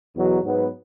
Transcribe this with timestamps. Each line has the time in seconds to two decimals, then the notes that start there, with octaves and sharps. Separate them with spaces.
0.15 E2 B2 F#3
0.44 G#2 F#3 B3